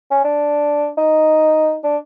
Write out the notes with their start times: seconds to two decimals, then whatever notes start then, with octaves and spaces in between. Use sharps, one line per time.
0.11 C#4
0.25 D4
0.98 D#4
1.84 D4